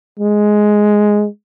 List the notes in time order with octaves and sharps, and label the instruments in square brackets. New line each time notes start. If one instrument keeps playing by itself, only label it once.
[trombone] G#3